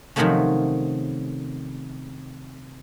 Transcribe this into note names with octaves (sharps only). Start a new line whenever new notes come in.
C3 D#3 F3 F#3 A3 C#4